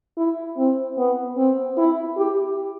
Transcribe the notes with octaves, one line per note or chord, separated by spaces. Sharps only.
E4
C4
B3
C4
E4
G4